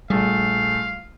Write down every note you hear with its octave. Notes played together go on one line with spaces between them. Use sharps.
A#1 G3 A3 G#4 F5